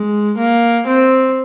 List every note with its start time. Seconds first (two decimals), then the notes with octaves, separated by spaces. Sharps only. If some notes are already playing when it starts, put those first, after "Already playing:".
Already playing: G#3
0.38 A#3
0.87 C4